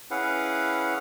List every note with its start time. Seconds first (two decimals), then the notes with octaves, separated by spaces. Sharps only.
0.11 C#4 E4 G#4 B4 F5 F#5